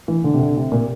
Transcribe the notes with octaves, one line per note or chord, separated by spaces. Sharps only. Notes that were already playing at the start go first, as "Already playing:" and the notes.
E3
D3
C3
D3
C3
A#2